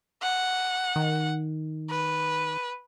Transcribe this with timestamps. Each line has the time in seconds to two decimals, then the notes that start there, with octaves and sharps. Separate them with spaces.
0.22 F#5
0.96 D#3
1.90 B4